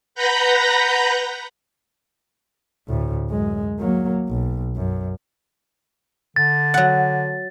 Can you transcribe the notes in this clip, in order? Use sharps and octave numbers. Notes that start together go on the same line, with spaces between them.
B4 F#5 A#5 B5 G6 A#6
D2 A2
F#2 G#3
F#3 A#3
B1
F#2
D3 A6
F#3 F#5